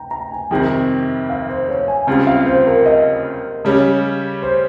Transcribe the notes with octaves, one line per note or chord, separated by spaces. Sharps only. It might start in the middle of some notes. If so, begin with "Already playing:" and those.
Already playing: G5 A#5
A#5
G#5
F2 C3 D#3 G3 C4 G5
F5
C5
C#5
G#5
C#2 C#3 G3 C4 F4
F5
C5
A#4
D#5
C#3 G3 C#4
C5